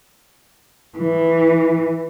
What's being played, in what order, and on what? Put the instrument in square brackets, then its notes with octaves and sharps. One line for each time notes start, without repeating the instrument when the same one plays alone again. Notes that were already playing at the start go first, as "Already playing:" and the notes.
[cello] E3